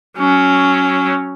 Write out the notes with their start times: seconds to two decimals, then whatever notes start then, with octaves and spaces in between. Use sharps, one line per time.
0.19 F#3 C#4